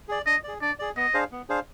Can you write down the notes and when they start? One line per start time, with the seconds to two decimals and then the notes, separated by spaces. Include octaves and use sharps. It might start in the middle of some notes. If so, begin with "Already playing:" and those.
0.09 G#4 D5
0.26 D4 D#5
0.44 G#4 D5
0.61 D4 D5
0.79 G#4 D5
0.96 B3 D#5
1.14 D4 G#4 C5 F5
1.32 B3
1.49 D4 G#4 C5 F5